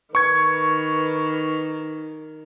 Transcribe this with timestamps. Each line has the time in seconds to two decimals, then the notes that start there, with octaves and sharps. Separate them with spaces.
0.15 D#3 B4 C#6 G#6